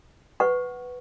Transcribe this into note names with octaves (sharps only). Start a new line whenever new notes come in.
B4 F#5 C#6